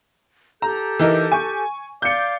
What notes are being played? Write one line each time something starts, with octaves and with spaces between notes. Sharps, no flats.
G4 A4 A#5 G6
E3 D#4 A#4
G#5 C#6
D5 F5 D6 G6 C#7